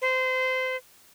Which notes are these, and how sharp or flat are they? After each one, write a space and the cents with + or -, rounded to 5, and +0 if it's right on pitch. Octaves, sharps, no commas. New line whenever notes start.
C5 -25